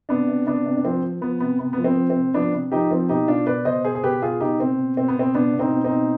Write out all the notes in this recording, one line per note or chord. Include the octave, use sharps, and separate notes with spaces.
C3 B3 D4
C3
C3 B3 D4
C3
D4
F3 C4
F3
F3 B3
C3 B3
C3 B3
F3 B3
C4
F3
C4
C3
F3 B3 D4
C3
F3 D#4 G4
F3 C4
B2 D#4 G4
B2 D4 F4
B2 B4 D5
B2 C5 D#5
B2 G#4 C5
G#4
B2 G4 B4
B2 F4 G#4
B2 D#4 G4
B2 C4
B2
B2 C4
B3
B2 C4
B2 B3 D4
B2
C4 D#4
B2
C4 D#4
B2